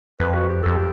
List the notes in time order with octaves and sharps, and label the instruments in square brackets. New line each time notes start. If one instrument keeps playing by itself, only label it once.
[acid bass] F2 [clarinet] B4
[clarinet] F#4
G4
[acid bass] F2 [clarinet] A4
[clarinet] G4